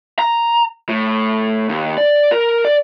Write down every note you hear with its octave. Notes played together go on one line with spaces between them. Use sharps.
A#5
A2
D#2
D5
A#4
D5